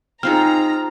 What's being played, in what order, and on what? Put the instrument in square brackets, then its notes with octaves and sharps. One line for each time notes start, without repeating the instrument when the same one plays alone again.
[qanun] C4 F4 G#4 [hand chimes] D#4 F6 [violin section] A#5